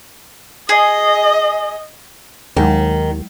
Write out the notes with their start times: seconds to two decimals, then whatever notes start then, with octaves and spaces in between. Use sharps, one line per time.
0.69 G#4 D#5
2.57 D#2 D#3 F#3 G#3